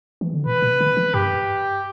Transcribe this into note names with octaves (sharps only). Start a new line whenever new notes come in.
E3
D3
B2 B4
B2
D3
E3
G2 G4